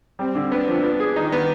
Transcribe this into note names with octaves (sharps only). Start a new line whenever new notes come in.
G3 C4
D3
B3 D4
F3
B3
G#4
D#3 D#4
B3